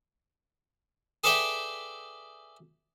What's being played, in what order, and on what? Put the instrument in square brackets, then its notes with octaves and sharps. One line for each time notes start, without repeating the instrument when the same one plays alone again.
[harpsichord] G#4 A4 B4 D5 E5 G5